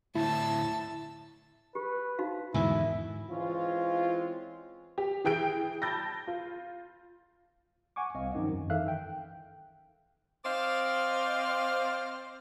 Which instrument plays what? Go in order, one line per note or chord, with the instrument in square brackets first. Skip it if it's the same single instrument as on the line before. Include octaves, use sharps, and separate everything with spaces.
[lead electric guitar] D2 A2 [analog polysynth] E4 [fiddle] A5 E6
[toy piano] G4 [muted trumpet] B4
[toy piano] D#4 F#4 F5
[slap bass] E2 D3 D#3 [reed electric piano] G#2 [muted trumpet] E4 [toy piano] G#5
[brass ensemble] E3 G#3 C4 C#4 F4
[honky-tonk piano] G4
E3 G#4 G5 G6 D7
A5 B5 G6 A6 A#6
F4
[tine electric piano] F#5 G#5 C#6 D6
C2 C4 D#5 F5
G2 D#3 F3 F#3 C#4 D#4
F#2
D#3 E3 A4 E5 F5 F#6
G5
[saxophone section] C4 C5 D5 D#5 F5